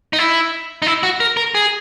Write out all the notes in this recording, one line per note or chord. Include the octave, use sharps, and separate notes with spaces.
D#4
E4
D#4
E4
F#4
A#4
A#4
G#4